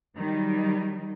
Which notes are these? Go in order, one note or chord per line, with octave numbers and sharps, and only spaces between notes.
D#3 F#3 G3 D#4